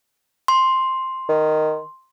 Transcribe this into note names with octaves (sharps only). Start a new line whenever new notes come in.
C6
D#3